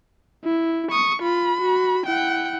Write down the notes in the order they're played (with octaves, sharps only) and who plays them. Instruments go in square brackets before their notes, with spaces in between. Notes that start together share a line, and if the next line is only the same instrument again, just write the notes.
[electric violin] E4
[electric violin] C#6 [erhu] D#6
[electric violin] F4 [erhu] B5
[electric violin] F#4
[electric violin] E4 F#5 [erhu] G5